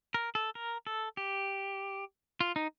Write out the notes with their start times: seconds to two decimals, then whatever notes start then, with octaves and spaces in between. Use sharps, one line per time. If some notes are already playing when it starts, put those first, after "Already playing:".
0.14 A#4
0.35 A4
0.55 A#4
0.87 A4
1.17 G4
2.41 F4
2.56 D#4